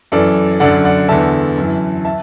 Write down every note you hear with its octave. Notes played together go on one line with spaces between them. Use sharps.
F#2 E3 A4 D5
F#2 D3 D5 F#5
D5 F#5
E2 D3 E5 A5
F#2 E3
E5 A5